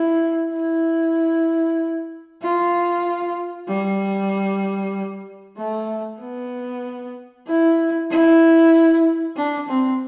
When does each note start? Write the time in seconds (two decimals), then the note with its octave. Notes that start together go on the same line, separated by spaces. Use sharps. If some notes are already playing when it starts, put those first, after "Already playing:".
Already playing: E4
0.53 E4
2.42 F4
3.68 G3
5.58 A3
6.21 B3
7.47 E4
8.10 E4
9.36 D4
9.68 C4